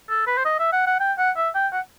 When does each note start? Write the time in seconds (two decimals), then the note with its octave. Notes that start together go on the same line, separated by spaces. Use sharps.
0.09 A4
0.27 B4
0.37 C5
0.45 D#5
0.59 E5
0.72 F#5
0.87 F#5
1.00 G5
1.18 F#5
1.36 E5
1.54 G5
1.73 F#5